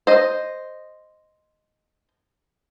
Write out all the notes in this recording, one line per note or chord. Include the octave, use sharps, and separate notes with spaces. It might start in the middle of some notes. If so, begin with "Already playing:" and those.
C5 D#5